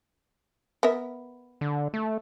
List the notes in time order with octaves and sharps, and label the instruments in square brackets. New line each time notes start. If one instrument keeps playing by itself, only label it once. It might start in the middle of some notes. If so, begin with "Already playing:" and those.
[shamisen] B3 A#4 E5
[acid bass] D3
A3